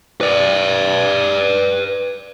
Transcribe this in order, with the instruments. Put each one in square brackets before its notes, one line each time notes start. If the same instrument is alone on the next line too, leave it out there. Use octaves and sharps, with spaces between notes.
[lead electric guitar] B4 D5